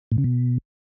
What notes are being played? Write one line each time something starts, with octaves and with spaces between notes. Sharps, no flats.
A2
C#3
B2